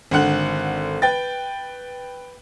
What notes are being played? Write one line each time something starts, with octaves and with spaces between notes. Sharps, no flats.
G#1 D3 F#5 F#6 F#7
B4 G5 A6